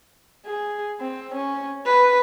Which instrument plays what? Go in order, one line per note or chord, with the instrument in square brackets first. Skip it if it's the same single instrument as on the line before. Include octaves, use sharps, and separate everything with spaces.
[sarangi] G#4
C4
C#4
B4